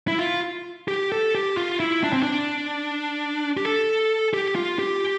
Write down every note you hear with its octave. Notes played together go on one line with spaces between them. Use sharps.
E4
F4
G4
A4
G4
F4
E4
D4
C4
D4
G4
A4
G4
F4
G4